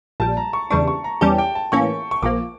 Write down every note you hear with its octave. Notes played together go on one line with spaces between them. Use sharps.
A#1 A#2 G3 A5
A#5
C#6
E2 C#3 E3 G3 D4 C#6
C#6
A#5
E2 E3 G3 C#4 G4 A5
G5
A5
A2 E3 A#3 C#4 C#6
C#6
A#1 A#2 F3 A#3 D6